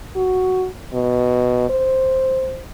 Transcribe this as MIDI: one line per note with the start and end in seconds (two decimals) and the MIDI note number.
0.15 0.67 66
0.93 1.65 47
1.69 2.61 72